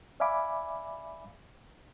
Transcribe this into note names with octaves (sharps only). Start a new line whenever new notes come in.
D5 E5 F5 G#5 B5 D6